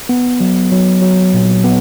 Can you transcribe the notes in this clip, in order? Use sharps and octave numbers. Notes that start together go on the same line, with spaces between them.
B3
F#3
F#3
F#3
A#2
B3